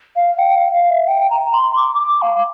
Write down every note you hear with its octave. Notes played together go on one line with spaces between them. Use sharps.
F5
G5
F5
F5
E5
G5
A#5
C6
D6
D6
F5